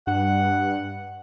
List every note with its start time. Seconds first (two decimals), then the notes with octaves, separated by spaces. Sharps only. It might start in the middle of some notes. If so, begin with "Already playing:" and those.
0.07 G2 F#5